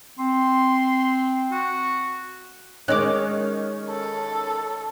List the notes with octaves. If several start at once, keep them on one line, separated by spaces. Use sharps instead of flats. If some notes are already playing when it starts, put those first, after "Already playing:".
C4 C6
F#4
D#3 G#3 C#4 D#5 D6 F#6
A4